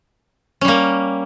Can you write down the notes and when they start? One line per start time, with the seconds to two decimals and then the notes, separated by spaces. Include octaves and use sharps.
0.61 C#4
0.65 G3
0.68 A#3